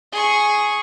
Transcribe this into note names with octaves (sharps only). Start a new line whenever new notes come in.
G#4 C#6